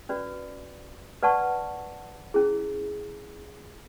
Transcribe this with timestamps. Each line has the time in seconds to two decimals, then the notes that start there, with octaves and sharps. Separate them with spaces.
0.09 C#4 F#4 B4 D5
1.23 B4 D5 F#5 A5 C#6
2.34 C#4 E4 G#4